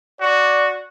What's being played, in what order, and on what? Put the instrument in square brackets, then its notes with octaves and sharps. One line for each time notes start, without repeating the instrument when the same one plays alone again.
[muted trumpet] F#4 [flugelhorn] D5